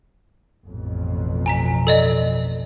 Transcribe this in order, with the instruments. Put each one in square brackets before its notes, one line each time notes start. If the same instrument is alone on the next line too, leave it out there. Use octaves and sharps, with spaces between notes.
[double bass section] A1 F2 B2
[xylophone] G#5 A#5 B6
A4 D5 D#5